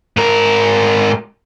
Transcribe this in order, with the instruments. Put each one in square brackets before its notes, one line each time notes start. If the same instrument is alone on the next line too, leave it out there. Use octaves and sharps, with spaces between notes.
[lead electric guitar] G#2 A#4